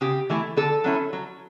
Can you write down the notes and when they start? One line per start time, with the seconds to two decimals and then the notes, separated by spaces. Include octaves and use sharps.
0.01 C#3 G4
0.30 E3 A3 E4
0.57 D3 A4
0.84 F#3 C#4 E4
1.13 F#3